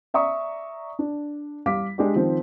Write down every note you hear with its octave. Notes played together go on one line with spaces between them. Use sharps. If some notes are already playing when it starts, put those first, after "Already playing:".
D5 E5 A#5 C#6 D#6
D4
G3 F5 D6 B6
G#3 D4 G4 D5
D#3 F3 C4